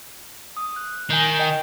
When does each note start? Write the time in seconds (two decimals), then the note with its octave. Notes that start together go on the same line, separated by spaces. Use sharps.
0.57 D#6
0.76 F#6
1.10 D#3 G#5 G6 C7
1.39 D#5 G5